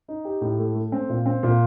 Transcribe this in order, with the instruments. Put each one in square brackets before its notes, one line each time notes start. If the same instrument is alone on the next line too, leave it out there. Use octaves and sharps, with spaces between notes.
[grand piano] D#4
G4
A2
A3
A3
C4
A#2
C4
A#2